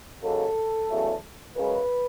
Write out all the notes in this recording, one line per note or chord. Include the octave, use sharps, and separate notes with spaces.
D#2 C#3 F#3 A4
E2 C#3 F#3 A3
F#2 C#3 G#3 B4